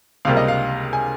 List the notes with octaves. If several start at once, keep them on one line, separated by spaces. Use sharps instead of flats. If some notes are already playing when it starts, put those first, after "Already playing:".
C#2 C3 G3 A#3 F5
D#5
F5
G#5